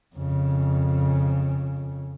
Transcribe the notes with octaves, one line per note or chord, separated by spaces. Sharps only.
F2 C#3